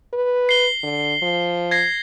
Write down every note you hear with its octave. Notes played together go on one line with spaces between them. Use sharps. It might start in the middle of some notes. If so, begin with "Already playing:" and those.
B4
C7 G7
D3
F3
G#6 A#6 C7